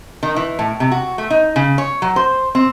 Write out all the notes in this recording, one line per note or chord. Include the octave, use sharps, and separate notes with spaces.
D#3
E3
A2
C3
F#4
A3
D#4
C#3
C#5
F#3
C5
C4